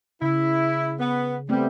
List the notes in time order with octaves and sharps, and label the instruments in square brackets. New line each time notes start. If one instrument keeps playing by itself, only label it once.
[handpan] C#3 [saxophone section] E4
[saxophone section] B3
[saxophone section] G3 [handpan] A3 B3 C4